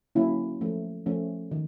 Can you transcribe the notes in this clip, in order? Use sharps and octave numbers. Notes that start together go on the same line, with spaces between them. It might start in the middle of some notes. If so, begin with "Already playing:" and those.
D3 F#3 A#3 C#4 E4
F3 A3 C#4
F3 A3 C#4
D#3